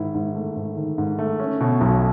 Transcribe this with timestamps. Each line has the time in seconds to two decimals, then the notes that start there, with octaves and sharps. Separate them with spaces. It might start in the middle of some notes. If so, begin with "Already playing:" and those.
Already playing: G#2 D#3 E4
0.14 G#2
0.35 A3
0.56 G#2
0.77 D#3
0.98 G#2
1.19 A3
1.40 C#4
1.60 B2
1.81 B1